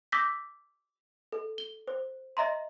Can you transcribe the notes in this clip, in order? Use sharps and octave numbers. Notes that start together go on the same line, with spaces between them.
D6 E6 G6 A#6 B6
A4
G7
C5
D#5 E5 A#5 C6